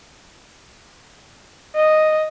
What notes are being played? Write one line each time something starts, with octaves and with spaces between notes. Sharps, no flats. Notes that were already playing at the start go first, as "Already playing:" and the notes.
D#5